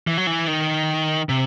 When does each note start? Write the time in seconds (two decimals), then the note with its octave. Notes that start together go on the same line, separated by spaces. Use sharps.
0.07 E3
0.18 F#3
0.27 E3
0.47 D#3
1.29 C3